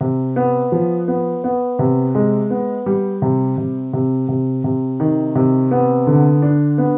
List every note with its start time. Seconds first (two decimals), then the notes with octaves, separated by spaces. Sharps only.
0.01 C3
0.36 B3
0.72 F3
1.08 B3
1.44 B3
1.79 C3
2.15 G#3
2.50 B3
2.86 G3
3.22 C3
3.57 C3
3.93 C3
4.28 C3
4.64 C3
5.00 D#3
5.35 C3
5.71 B3
6.07 D3
6.42 D4
6.78 B3